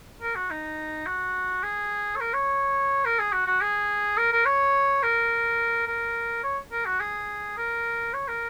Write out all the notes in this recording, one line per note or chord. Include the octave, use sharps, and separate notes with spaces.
A#4
F#4
D#4
F#4
G#4
C#5
A#4
C#5
A#4
G#4
F#4
F#4
G#4
A#4
A#4
C#5
A#4
A#4
C#5
A#4
F#4
G#4
A#4
C#5
A#4